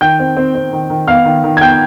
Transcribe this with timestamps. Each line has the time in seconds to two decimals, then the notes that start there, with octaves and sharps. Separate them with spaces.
0.01 D#3 G5 G6
0.19 C4
0.37 C4
0.55 C4
0.73 D#3
0.90 D#3
1.08 B3 F5 F6
1.25 D#3
1.44 D#3
1.57 G#6
1.61 B3 G5 G6